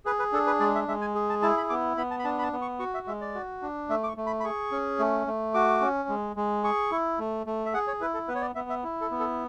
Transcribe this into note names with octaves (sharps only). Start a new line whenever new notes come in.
G#4 B4
B4
D4 A4
B4
G#3 D5
E5
G#3 E5
G#5
G#4
A5
E4 A5
B5
B3 D6
B3 B5
A5
B5
D4 A5
B5
A5
B3
C#6
F#4 C#6
E5
G#3 E5
D5
F#4
D4
A3 E5
D6
C#6
A3
B5
B5
G#4 C#6
C#4
A3
A3
F#4 D6
C#4
G#3
G#3
G#4 C#6
E4
A3
A3
E5
G#4 F#5
C#5
E4 B4
A4
B3 B4
C#5
D5
B3 E5
E5
E4
A4
B3
A4